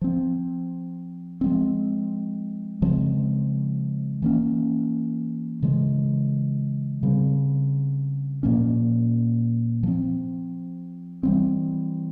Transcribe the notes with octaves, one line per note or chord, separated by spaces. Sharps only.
F3 C4
F3 G#3 C4
C#3 F3 G#3 C4
E3 A#3 C#4
C#3 E3 G#3
C#3 G3 C4
A#2 F3 A#3 C#4
F3 C4
E3 G3 C4